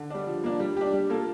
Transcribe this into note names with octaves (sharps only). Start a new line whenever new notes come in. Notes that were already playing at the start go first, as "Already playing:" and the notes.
Already playing: D3
G3 D4
F3
A#3 D4
G3
D4 G4
G3
A#3 F4 A4